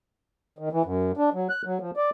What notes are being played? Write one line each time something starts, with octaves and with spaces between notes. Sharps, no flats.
D#3
E3
F#2
D4
F#3
F#6
F#3
F3
D5